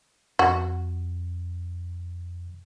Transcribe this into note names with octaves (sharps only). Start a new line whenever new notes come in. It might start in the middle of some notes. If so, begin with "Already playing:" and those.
F2 F#4